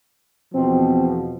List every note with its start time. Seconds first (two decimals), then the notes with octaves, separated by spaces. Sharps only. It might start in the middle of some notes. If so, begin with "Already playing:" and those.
0.54 E2 B2 F3 C4